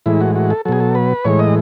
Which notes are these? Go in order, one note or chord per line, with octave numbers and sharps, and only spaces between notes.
A2 E3 G#3 E4
F#4
F#4
A4
B2 F#3 G#4 A4
A4
B4
A2 E3 G#3 C#5
D#5